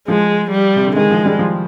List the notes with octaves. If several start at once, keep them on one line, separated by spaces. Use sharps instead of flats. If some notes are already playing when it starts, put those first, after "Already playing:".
F3 G#3
G3
C3
D3
D#3 G#3
F3
G3
F3